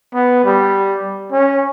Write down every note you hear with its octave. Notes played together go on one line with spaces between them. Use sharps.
B3
G3
C#4